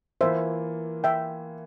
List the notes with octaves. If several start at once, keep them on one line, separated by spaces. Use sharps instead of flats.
E3 A#3 F4 C5 E5
E5 G5